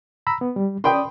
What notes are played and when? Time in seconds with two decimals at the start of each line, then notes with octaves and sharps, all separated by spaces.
0.27 A#5 B5 E6
0.41 B3
0.56 G3
0.84 C#4 D5 G5 B5 C6 D#6